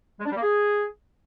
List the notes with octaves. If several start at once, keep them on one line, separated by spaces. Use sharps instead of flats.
G#3
D4
G3
A#3
G#4